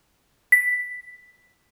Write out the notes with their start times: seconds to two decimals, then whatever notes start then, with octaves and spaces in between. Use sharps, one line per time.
0.52 B6